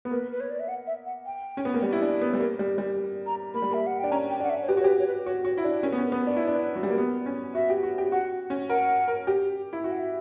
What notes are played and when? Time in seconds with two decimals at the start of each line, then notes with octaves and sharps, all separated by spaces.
0.05 B3
0.11 A#3 B4
0.32 B4
0.40 C#5
0.50 D5
0.60 E5
0.68 F#5
0.87 E5
1.06 F#5
1.26 G5
1.57 C#4
1.65 B3
1.74 A#3
1.83 G3
1.92 E4
2.01 D4
2.21 B3
2.33 G3
2.40 A#3
2.59 G3
2.78 G3
3.26 A#5
3.54 A#3 B5
3.62 G3
3.71 A#3 E5
3.87 F#5
3.99 D4 G5
4.12 C#4 A#5
4.30 G5
4.40 D4 F#5
4.50 E5
4.62 C#5
4.69 G4 B4
4.77 F#4
4.80 C#5
4.84 G4 B4
4.99 C#5
5.07 B4
5.25 F#4 C#5
5.45 F#4 C#5
5.58 E4
5.64 D4
5.83 C#4 A#4
5.92 B3
5.98 C#4
6.05 A#4
6.12 B3
6.27 D4
6.36 E4 B4
6.47 D4
6.75 F#3
6.83 G3
6.90 A#3
6.98 B3
7.26 C#4
7.55 F#4 E5
7.70 G4
7.83 F#4
7.98 G4
8.12 F#4 F#5
8.50 C#4
8.69 A#4 F#5
9.08 A#4
9.27 G4
9.73 E4
9.83 F#4 E5
9.91 F#5
9.99 E5